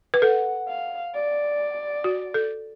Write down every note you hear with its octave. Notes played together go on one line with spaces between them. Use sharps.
B4
A4 F#5
F5
D5
F#4
A4